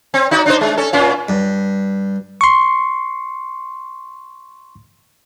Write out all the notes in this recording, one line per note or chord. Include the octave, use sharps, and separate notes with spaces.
C4
D#4 F#4 D5
D4 D#4 C5
G#3
C#4 A4
A#2 C#4 F4
G2
C6 C#6